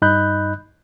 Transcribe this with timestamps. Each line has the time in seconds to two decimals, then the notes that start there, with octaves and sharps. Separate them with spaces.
0.02 G2 D#4 D#5 B5 F#6 G6